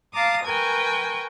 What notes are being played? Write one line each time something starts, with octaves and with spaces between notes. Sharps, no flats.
F5 A5 A#5 D6 D#6
A#4 B4 G5 G#5 C#6